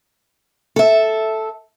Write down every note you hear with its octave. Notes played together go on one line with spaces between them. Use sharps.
A4 E5